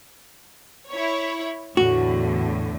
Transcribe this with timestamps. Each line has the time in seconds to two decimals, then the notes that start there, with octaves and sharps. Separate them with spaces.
0.90 E4 C#5
1.77 E2 A2 D3 F#4